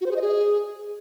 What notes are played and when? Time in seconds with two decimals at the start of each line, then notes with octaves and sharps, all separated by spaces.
0.01 F#4
0.06 C5
0.11 G#4
0.16 D#5
0.21 G#4